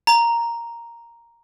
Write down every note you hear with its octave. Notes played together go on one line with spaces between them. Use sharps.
A#5